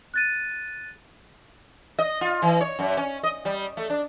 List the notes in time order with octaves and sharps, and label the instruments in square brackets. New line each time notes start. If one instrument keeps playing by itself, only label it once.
[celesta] F#6 A6 D#7
[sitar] D#5
F4
E3
C#5
F#2
C#4
D#5
G3
A3
D4